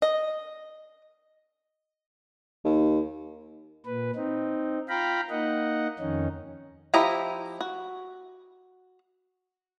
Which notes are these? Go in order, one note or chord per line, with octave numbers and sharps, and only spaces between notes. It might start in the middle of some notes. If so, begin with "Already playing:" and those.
D#5
D#2
A#2 B4
C4 D#4
F4 F5 G5 A#5 B5
A#3 D#4 D#5 F#5
F2 D#3 C#4 D#4
F3 E4 G4 D#5 A#5
F#4